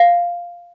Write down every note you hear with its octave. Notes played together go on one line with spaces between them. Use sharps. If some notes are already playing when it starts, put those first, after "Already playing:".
Already playing: F5